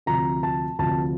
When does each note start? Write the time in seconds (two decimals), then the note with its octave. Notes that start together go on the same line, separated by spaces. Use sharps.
0.06 D2 C3 F3 A#5
0.43 A5
0.79 D2 C3 F3 A5